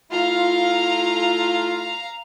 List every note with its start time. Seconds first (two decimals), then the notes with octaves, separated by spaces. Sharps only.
0.11 A3 E4 F4 F5 A#5